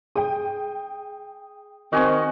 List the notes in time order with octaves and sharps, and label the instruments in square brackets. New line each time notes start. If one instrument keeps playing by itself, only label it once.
[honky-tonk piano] G#4 G5 [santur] D#6
[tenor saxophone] D#3 [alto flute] C4 [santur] F#4 G#5 C#6